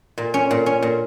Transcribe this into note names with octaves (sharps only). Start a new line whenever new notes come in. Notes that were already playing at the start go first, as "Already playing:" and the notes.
A#2
C#4
A#2
C#4
A#2